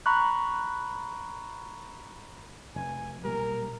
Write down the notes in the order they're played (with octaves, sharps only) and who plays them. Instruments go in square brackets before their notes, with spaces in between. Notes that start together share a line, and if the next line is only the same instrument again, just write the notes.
[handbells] A#5 B5 C#6 F#6
[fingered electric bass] F1 [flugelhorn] G#5
[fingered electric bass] B1 A#2 G3 [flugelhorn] A#4